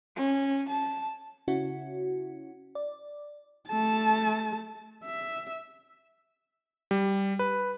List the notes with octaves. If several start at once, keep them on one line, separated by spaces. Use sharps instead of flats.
C#4
A5
C#3 C#4 E4 F#4
D5
A3 A5
E5
G3
B4